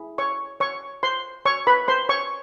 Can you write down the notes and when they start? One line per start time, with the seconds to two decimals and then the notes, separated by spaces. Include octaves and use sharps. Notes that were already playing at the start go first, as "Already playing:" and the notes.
Already playing: E4 G#4
0.18 C#5 C#6
0.60 C#5 C#6
1.03 C5 C6
1.45 C#5 C#6
1.67 B4 B5
1.88 C5 C6
2.09 C#5 C#6